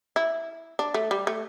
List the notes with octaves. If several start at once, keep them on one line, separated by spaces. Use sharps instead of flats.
E4
D4
A3
G3
A3